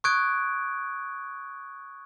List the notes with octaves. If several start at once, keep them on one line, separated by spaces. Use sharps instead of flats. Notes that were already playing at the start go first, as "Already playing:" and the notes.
C#6 D#6 F#6 G#6 D7